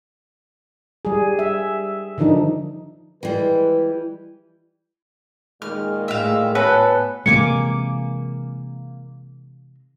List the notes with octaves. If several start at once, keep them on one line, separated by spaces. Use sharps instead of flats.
G3 G#4
E5
D3 D#3 F3 D4 D#4
E3 F3 G3 G#3 B4
A#2 D#3 G#3 F6
A2 E5 F5
B3 F#4 A4 B4 C#5 G#5
C3 E3 G#3 A#3 G#5 D6 C#7